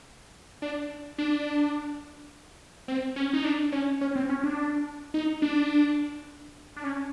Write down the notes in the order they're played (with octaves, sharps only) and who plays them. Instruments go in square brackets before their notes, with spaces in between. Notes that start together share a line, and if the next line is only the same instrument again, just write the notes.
[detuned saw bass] D4
D4
C4
C#4
D#4
D4
C#4
C#4
C4
C#4
D4
D#4
D4
D4
C#4